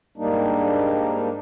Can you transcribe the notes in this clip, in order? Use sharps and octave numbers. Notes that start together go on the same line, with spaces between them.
G#2 G3 A#3 D4 D#4